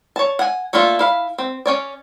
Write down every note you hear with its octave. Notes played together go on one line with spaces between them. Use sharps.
C#5 A5
F#5 G#5
A3 A#3 D4 F4 A4
E4 F5 B5
C4
C#4 C#5 D5